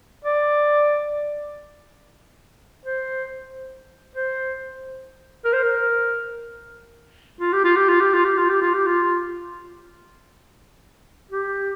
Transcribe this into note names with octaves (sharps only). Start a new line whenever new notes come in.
D5
C5
C5
A#4
C5
A#4
F4
G4
F4
G4
F4
G4
F4
G4
F4
G4
F4
G4
F4
G4